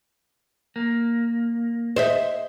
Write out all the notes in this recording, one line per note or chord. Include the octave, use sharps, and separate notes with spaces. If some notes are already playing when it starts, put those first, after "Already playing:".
A#3
C5 D#5 E5